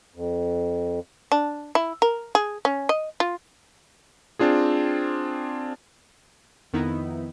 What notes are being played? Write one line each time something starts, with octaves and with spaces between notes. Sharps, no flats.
F2
D4
E4
A#4
G#4
C#4
D#5
F4
C4 D4 F4 G#4
F2 D#3 B3 D#4 E4